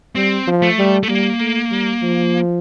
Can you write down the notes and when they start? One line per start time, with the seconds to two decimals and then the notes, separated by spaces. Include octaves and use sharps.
0.15 G3 C4
0.47 F3
0.62 A3
0.78 G3
1.03 A3
1.08 G3 A#3
1.40 A3
1.71 G3
2.02 F3